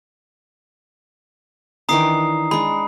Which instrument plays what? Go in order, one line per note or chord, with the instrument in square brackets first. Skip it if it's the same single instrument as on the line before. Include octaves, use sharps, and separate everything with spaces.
[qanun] D#3 E3 D4 [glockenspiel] A#5 D#6 C7
[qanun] G#3 D4 [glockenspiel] B5